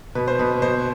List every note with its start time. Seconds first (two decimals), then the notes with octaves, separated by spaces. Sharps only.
0.15 B2 B4
0.28 C5
0.39 B2 B4
0.62 B2 C5